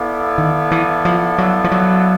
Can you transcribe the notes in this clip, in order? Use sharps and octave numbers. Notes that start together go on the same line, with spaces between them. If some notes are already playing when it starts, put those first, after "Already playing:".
Already playing: B3 E4 A4 D5 F5
D#3
E3
F3
F#3
F3
F#3